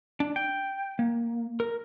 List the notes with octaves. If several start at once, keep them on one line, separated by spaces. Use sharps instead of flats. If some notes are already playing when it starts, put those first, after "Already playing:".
D4
G5
A#3
A#4